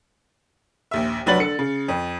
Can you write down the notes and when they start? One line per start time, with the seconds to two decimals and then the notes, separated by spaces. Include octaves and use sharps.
0.91 A#1 D#2 E5
1.26 F1 F#3 D4 B4 A6 F#7
1.39 D3 C#7
1.59 C#3
1.88 F2